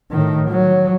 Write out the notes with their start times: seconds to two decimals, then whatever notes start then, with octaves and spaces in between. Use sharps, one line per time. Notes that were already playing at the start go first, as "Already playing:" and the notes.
0.11 A2 D#3
0.49 F#3